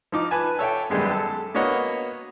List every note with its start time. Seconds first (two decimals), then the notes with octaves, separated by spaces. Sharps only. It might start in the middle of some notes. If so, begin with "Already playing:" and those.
0.12 F3 D#4 D6
0.31 B4 G#5 A5
0.59 A4 C#5 E5 G5
0.90 F#2 D#3 G3 G#3 B3
1.11 A4
1.55 A#3 B3 F#4 C#5 D#5 F#5